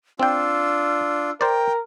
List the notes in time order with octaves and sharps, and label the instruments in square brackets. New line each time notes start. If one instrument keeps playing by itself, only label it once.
[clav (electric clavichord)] C4 G5 [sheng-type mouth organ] D4 F4 [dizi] E6
[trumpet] A#4 [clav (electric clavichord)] C5 D5 [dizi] G5